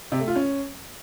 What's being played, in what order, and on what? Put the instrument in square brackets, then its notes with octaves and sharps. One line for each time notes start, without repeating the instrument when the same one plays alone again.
[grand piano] C3
A3
F4
C#4